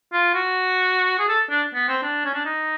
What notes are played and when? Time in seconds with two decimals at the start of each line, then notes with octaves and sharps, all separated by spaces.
0.13 F4
0.34 F#4
1.19 G#4
1.28 A4
1.50 D4
1.74 B3
1.88 C4
2.02 D4
2.25 C#4
2.34 D4
2.45 D#4